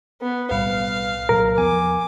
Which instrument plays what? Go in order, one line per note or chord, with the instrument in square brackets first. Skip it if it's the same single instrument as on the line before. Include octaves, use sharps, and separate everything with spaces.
[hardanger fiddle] B3
[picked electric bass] B1 A2 G3 [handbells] B4 [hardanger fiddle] F5
[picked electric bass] C2 A#2 F#3 [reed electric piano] A#4
[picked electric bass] E2 F3 B3 [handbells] G#5 [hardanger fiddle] D6